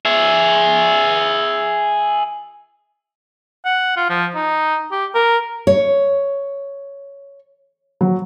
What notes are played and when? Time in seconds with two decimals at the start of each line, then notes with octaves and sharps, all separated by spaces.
0.05 G#4 E5
3.65 F#5
3.97 F4
4.10 F3
4.35 D#4
4.92 G4
5.15 A#4
5.67 C#5
8.01 F#3